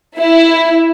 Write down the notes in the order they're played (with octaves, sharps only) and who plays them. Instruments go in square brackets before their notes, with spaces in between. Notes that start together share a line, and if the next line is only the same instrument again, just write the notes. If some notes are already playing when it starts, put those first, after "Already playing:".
[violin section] E4